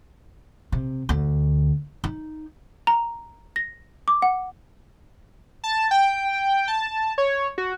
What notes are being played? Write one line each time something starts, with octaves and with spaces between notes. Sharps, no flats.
C3
D2
D#4
A#5
A#6
D6
F#5
A5
G5
A5
C#5
F#4